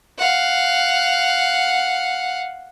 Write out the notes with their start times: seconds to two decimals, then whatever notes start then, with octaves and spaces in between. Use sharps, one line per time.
0.18 F5 F#5